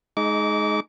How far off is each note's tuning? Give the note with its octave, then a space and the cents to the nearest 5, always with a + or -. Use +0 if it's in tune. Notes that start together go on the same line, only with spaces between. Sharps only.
G#3 +30 D#4 +0 D6 -30